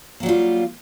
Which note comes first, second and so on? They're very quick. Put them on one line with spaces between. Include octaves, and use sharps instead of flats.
A#3 F#3 G3 F4